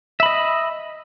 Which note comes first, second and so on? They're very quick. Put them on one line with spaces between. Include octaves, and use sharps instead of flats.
E5 B5 D#5